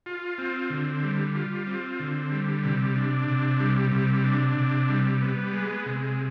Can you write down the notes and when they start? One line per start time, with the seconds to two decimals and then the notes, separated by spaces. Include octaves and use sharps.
0.06 F4
0.38 C4
0.70 D3
1.03 G3
1.35 F4
1.67 C4
2.00 D3
2.32 G3
2.64 C3
2.96 D4
3.28 C3
3.60 G3
3.92 C3
4.24 D4
4.57 C3
4.89 G3
5.21 B3
5.53 G#3
5.86 C3